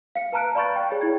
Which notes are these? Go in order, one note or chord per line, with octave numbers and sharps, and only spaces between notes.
F5 C#7
B4 A5 A#5 F6 F#6 D7
D5 F5 B5 C#6 G6 A6
G5
G#4 C#5 G5
E4 G#4 G#6